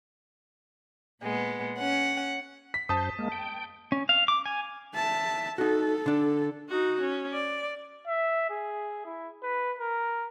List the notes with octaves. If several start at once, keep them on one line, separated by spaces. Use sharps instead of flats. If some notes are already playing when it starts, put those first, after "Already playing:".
A#2 G#3 B3
C#4 F#5
B6
F#2 C5 A5 D#6
G#3 A#3
G5
C#4
F5
D6
G#5
E5 A5
D#4 F#4 A4
D3 D4
D#4 F#4
C#4
D5
E5
G#4
E4
B4
A#4